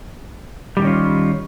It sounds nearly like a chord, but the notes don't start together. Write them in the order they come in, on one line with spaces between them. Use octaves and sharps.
G3 D3 D#3 C#4 F4